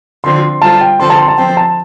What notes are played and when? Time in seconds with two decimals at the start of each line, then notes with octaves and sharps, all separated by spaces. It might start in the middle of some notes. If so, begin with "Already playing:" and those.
0.24 D3 F3 C4 C6
0.62 G3 F4 A4 C5 A5
0.81 G5
1.00 D3 F3 C4 A4 C6
1.10 A5
1.19 C6
1.28 A5
1.38 F3 C4 A4 C5 G5
1.57 A5